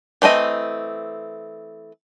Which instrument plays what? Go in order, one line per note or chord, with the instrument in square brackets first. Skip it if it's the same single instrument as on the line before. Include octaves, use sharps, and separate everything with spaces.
[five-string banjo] E3 A3 C4 D#5